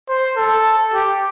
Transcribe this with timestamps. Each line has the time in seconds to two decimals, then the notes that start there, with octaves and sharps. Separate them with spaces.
0.09 C5
0.37 A4
0.94 G4